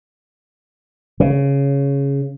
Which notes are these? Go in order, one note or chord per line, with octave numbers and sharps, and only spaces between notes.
C#3